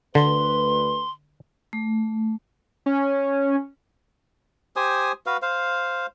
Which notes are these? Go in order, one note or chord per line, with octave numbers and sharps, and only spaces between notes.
D2 D3 B4 C6
A3
C#4
G4 C5 G#5 D#6
F#4 B4 F5
C5 F5